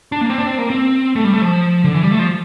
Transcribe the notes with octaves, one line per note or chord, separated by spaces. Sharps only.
D4
A#3
C4
D4
C4
A#3
C4
A3
G3
A3
F3
D3
E3
G3
A3
F3